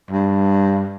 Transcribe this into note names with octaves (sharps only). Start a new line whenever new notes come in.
G2